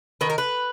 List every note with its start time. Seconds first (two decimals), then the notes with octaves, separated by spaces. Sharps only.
0.21 D#3 B4
0.30 A#4
0.38 B4